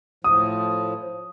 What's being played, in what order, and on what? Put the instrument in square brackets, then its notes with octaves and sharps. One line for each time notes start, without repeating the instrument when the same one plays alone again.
[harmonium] A2 F3 [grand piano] D#6